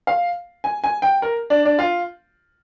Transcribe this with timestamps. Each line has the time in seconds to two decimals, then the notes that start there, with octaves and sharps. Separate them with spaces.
0.07 F5
0.64 G#5
0.84 G#5
1.02 G5
1.22 A#4
1.50 D4
1.65 D4
1.79 F4